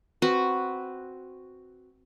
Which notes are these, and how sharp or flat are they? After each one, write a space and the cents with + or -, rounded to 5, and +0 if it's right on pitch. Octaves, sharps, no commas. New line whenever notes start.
C4 +0 F#4 +0 B4 +0